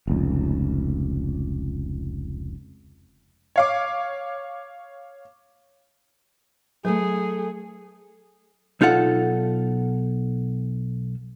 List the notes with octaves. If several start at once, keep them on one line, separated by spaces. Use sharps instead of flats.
F1 C#2
C#5 F5 D6
F#3 A3 G#4 A4 B4
B1 D#4 F4 A4 F#5